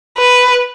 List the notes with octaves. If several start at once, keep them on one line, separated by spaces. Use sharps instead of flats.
B4